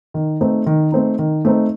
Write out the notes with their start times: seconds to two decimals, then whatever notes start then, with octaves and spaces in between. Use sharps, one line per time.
0.14 D#3
0.41 A3 C4 D#4
0.66 D#3
0.92 A3 C4 D#4
1.19 D#3
1.45 A3 C4 D#4